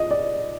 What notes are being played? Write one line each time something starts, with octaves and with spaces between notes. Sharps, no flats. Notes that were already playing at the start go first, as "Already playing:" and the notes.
Already playing: D#5
D5